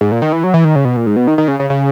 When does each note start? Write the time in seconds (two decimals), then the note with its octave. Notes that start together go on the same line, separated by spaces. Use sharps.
0.01 G#2
0.12 A#2
0.22 D#3
0.33 E3
0.44 F#3
0.54 E3
0.65 D#3
0.76 C#3
0.85 B2
0.97 A#2
1.07 G#2
1.16 B2
1.27 D#3
1.38 D#3
1.48 C#3
1.60 C#3
1.70 C#3